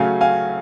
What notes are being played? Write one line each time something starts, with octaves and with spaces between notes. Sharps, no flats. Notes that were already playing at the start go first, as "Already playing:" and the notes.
Already playing: C#3 F#3 A3 C#4 F5 G#5
F5 G#5